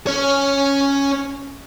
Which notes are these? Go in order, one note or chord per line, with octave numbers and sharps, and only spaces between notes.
C#4 C#5